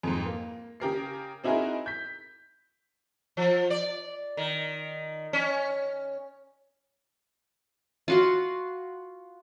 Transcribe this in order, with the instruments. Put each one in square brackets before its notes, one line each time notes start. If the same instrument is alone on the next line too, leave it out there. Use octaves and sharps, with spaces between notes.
[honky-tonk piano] F2 G#2
A#3
C#3 G4 A#4 C7
C4 D#4 E4 F#4 G#4 A#4
G6 B6
[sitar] F3
D5
D#3
C#4
[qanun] F4 F#4 F#5